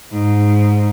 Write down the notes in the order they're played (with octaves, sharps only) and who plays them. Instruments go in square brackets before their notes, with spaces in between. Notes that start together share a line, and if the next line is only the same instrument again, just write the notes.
[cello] G#2